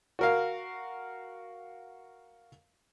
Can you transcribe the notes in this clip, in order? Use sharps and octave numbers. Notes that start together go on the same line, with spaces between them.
F#4 A#4 F5